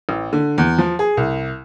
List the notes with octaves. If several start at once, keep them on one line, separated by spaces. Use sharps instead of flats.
A1
D3
E2
F3
G#4
C2